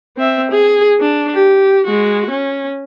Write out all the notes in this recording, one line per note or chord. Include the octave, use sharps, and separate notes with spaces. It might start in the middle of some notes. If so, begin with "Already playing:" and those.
C4 E5
G#4
D4
G4
G#3 F#4
C#4